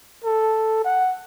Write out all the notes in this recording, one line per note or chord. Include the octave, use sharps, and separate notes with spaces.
A4
F#5